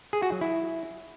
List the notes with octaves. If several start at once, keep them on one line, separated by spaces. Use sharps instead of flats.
G#4
F#4
F#3
E4